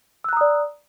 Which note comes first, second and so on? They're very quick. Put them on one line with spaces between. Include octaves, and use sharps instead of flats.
E6 F#6 A#5 D#6 D5